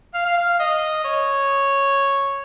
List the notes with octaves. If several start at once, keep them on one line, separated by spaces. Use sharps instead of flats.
F5
F5
F5
F5
D#5
C#5